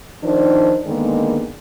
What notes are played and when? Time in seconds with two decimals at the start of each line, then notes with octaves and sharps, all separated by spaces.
0.23 D#3 F3 D4 D#4 C5
0.86 D3 D#3 G#3 A#3 B3